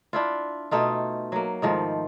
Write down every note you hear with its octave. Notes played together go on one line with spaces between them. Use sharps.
D4 E4 F4
B2 A3 D#4 F4
F#3 A#3
G#2 D#3 F3 A3